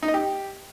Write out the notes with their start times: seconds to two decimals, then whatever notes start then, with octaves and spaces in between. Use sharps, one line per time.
0.03 D#4
0.08 D#5
0.14 G4